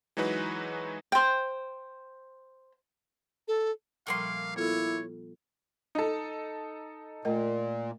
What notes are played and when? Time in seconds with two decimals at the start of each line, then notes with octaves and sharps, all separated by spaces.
0.17 E3 F#3 G#3 D#4 F#4 B4
1.12 C5 G5
3.48 A4
4.07 A#2 F3 G3 A3 A#3 F5 C6
4.56 B3 E4 F4 A4 C#5
5.95 D#4 A4
7.25 A#2 A3 A#4 D#5